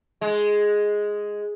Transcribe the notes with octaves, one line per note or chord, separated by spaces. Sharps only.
G#3